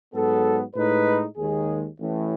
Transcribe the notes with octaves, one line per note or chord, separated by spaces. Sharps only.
G#2 F#3 B3 A4
A2 G#3 D#4 B4
D#2 D#3 G#3 G#4
A1 A2 E3